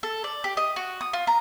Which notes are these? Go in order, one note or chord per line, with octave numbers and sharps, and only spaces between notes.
A4
D5
G4
D#5
F#4
D#6
F4
A#5